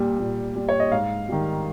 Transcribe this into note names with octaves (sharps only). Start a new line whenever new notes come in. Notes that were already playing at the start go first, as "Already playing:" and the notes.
Already playing: A#2 G3
A#2
G3
C#5
D#5
G#2 F5
D#3 G3